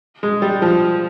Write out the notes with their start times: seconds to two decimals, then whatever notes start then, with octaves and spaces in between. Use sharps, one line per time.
0.23 G#3
0.42 G3
0.62 F3